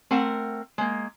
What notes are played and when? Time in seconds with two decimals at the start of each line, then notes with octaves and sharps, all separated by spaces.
0.11 A3 C4 A#4 F#5
0.78 G#3 A#3